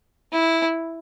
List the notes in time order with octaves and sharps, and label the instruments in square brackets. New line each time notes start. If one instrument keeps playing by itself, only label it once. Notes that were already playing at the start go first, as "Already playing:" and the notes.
[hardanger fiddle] E4